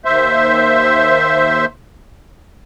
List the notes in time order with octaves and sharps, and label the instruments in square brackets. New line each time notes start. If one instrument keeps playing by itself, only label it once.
[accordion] D#2 C5 E5